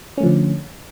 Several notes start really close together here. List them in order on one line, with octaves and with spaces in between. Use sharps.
C#4 A3 F3 D3